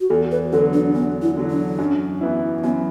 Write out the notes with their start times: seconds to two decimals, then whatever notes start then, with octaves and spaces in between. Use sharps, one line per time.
0.01 F#4
0.10 E2 A4
0.32 B4
0.52 D3 F#3 A4
0.73 D4
0.94 E2 B3
1.22 E4
1.37 D3 F#3
1.51 D4
1.79 F#2
2.21 E3 B3 E4
2.64 F#2 B3